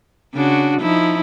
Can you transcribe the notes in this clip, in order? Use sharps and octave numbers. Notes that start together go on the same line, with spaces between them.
C#3 D4 F#4
F3 D#4 E4